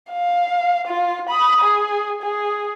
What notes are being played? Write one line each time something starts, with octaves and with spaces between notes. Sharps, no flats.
F5
F4
B5 D#6
G#4
G#4